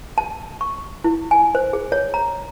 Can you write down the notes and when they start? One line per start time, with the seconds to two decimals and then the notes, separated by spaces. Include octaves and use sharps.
0.18 A5
0.61 C#6
1.04 E4
1.31 G#5
1.55 C5
1.73 G#4
1.92 C#5
2.14 A#5